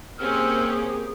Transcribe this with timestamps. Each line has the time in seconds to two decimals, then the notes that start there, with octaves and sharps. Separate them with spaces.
0.19 A#3 C4 C#4 G4 G#4 E6 F6